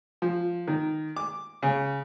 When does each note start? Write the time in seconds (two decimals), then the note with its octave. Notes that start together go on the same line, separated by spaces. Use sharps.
0.22 F3
0.68 D#3
1.16 D6
1.63 C#3